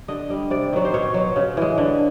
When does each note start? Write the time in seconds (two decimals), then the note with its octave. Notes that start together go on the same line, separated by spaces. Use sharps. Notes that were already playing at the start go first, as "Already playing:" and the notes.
0.08 D3 D#5
0.30 G3
0.50 C3 D5
0.73 D#3 F#3
0.85 C5
0.93 B2 C#5
1.14 F#3
1.36 C#3
1.57 E3 G#3
1.78 D3